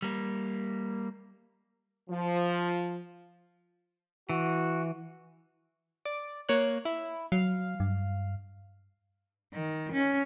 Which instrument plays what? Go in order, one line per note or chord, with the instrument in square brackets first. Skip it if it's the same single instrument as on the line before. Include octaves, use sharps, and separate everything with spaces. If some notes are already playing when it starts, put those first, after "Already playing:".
[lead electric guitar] G3 A#3
[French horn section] F3
[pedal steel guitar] E3 [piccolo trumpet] F#4
[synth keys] D5
A#3 C#5 F#6
E4
[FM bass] F#3 [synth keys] F5
[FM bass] G2
[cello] D#3
C#4